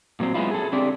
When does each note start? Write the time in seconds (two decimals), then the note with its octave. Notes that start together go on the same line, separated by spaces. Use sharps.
0.20 A#2 F#3 C4
0.34 G#3 B3 C#4 E4 F4
0.51 G#4 A4
0.73 D3 C4 G4 D5